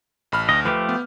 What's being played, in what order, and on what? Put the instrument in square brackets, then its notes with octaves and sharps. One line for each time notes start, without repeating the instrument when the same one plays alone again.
[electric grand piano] A1 B5 F6
[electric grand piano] D2 [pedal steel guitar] D#5
[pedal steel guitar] F3 A3 G4 [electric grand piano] B4
[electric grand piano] B3